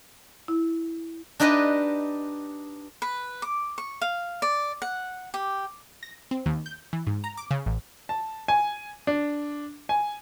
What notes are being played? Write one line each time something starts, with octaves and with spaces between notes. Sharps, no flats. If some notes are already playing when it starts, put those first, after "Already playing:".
E4
D4 D#4 G4 B4 D#5
B4
D6
C#6
F5
D5
F#5
G4
A#6
C4
D#2
G6
E3
G#2
A#5
D6
C#3
A1
A5
G#5
D4
G#5